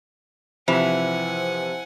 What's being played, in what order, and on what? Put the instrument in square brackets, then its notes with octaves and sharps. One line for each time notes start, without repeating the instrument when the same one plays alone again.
[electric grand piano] C3 F3 [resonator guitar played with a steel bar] E3 [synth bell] C5 [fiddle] F#5 G#5